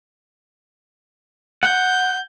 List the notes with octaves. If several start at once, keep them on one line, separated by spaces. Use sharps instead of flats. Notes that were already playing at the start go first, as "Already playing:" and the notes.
F#5 G6